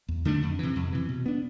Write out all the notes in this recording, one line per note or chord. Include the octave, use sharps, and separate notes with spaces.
E2
D3 A3 D4
F2
C3 E3
F2
C3 E3
B2
B3 D4